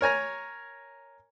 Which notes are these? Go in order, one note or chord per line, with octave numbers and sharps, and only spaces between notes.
A#4 C#5 G#5 A#5